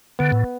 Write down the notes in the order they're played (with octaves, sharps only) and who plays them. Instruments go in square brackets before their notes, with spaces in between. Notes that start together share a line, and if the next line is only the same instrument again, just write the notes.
[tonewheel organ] D3 [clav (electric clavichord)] B3
[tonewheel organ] A2